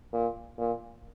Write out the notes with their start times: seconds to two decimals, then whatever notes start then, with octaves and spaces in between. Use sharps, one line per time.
0.13 A#2
0.58 A#2